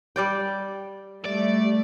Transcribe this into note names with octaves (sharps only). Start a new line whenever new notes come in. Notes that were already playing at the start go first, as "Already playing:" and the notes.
G3 D5 G5
G3 A3 D5